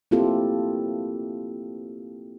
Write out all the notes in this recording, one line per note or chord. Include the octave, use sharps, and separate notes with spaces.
A#3 C4 E4 F4 G4 A4